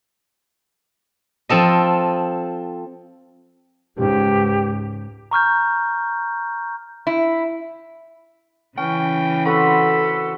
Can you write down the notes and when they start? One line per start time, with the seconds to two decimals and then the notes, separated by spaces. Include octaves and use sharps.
1.49 F3 C4 A4 D#5
3.98 C#2 G#2 G4
5.31 A#5 C#6 F6 G6
7.07 E4
8.78 C#3 E3 C#4 G5
9.45 C4 F#4 A4 B4 B5